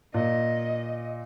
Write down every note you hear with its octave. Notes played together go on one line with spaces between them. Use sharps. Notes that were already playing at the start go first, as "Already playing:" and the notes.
A#2 D#5